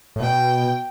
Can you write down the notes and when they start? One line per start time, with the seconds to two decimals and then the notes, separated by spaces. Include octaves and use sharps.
0.16 A2
0.20 B2 G5